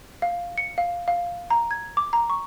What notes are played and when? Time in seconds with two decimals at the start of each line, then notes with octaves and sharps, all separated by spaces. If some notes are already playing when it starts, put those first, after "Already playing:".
0.22 F5
0.58 C#7
0.78 F5
1.08 F5
1.50 A#5
1.71 G#6
1.97 D6
2.13 A#5
2.30 C#6